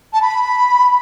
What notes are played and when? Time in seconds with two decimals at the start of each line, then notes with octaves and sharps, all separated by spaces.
0.13 A5
0.22 B5